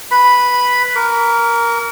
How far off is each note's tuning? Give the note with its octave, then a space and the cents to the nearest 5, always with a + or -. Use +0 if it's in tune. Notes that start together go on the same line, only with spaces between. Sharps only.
B4 +0 B5 +0
A#4 +0 D6 -45